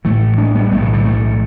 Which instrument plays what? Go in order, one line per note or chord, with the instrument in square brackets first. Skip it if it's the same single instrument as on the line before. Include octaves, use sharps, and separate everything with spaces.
[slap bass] A1 A2 E3 A3
A3 D4
G3 B3
B1 A2 E3 A3
E3
D3 G3
E3 A3